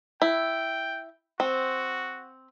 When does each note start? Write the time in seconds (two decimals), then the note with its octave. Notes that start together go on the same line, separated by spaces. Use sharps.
0.22 E4 G5
1.40 C4 F#4